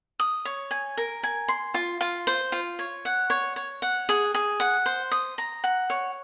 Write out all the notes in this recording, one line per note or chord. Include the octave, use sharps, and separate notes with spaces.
D#6
C#5
G#5
A#4
G#5
C6
F4
F4
C5
F4
C#5
F#5
C#5
C#5
F#5
G#4
G#4
F#5
C5
D#6
A#5
F#5
C#5